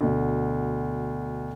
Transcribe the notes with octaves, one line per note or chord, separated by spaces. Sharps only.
D2 B2